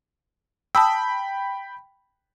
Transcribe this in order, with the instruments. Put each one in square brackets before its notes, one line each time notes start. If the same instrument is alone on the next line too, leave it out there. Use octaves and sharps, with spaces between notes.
[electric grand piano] G5 B5 [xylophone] A5 D#6 E6